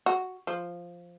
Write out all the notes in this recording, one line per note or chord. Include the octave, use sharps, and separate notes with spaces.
F#4
F3